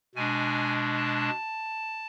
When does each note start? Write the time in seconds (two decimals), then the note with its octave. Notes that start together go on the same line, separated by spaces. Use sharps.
0.15 B2 G#3 D4 G#5
0.98 A5